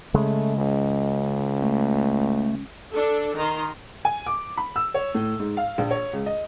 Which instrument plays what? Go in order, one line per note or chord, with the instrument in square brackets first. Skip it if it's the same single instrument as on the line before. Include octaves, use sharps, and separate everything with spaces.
[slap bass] C#3 G#3 [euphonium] A3
[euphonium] C#2
[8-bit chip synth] A3
[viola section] D4 A4
D#3 A#5 C6
[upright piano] G#5
D6
B5
E6
C#5
A2
G#2
F5
A#1
C#5
C#2
D#5